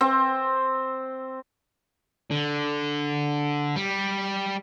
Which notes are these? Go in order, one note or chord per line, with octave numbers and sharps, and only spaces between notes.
C4
D3
G3